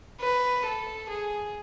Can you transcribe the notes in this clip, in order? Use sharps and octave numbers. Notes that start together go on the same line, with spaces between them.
B4
A4
G#4